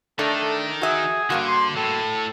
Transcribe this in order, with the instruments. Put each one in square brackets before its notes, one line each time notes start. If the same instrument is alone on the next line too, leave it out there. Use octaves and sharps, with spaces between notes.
[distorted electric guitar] D#3 D#4 [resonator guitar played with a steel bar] A3 D4 [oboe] A4
[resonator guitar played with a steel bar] F#4 E5 [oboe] G#4
[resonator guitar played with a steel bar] G2 A#3 F#4 [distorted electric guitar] D3
[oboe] C6
[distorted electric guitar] A2 [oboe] A4